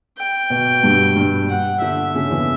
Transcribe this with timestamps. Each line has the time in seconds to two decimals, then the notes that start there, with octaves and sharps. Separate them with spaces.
0.17 G5
0.50 B2 B3
0.83 G2 G3
1.16 G2 G3
1.49 F#5
1.81 D3 D4 E5
2.15 C#3 C#4
2.31 E2 E3